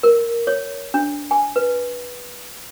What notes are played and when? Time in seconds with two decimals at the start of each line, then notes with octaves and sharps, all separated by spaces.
0.03 A#4
0.47 C#5
0.94 D4
1.31 G#5
1.56 B4